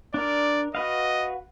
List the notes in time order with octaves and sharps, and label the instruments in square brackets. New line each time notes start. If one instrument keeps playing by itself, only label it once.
[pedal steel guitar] D4 A#4 [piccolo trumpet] D5
[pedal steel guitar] F#4 B4 F5 [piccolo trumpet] D#5